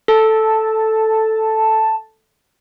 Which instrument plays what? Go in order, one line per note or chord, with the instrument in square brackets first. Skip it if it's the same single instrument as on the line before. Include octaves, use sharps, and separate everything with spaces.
[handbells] A4 [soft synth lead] A5